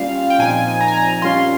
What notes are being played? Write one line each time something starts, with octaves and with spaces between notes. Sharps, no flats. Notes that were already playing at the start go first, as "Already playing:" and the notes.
Already playing: G3 A#3 C#4 F4 F5
G5
A#2 F3 C4 D#4 G#5
A#5
G#5
A#5
A#2 G3 C#4 F4 C6